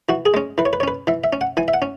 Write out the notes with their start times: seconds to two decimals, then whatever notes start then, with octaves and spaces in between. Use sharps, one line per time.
0.09 E3 F#4
0.26 G#4
0.34 G#3 C#4
0.58 E3 B4
0.66 C#5
0.73 B4
0.80 C#5
0.83 C#4 B4
1.07 E3 E5
1.24 E5
1.33 C#4
1.41 F#5
1.57 E3 G#5
1.68 E5
1.74 F#5
1.82 C#4